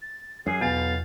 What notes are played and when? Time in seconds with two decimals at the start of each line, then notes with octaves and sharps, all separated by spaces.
0.02 A6
0.46 F#2 G#4 C7
0.61 B1 E2 B2 F5 A6